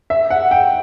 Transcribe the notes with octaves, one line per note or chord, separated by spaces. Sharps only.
E5
F#5
G5